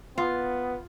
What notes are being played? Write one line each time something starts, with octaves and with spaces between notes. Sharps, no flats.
B3 F4